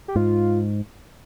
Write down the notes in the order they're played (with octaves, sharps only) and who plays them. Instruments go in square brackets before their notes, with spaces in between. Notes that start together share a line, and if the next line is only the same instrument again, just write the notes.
[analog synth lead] G4
[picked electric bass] G#2 [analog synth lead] F4